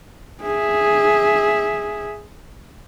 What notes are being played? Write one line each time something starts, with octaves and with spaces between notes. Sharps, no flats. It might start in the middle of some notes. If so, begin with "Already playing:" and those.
G#4 E5